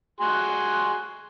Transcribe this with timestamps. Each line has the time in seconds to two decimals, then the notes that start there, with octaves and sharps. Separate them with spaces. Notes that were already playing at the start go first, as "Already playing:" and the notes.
0.21 F#4 G#4 C6